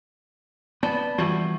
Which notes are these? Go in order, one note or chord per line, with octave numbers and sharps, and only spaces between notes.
B3 D5 A5 B5
E3 F3 G3 F#4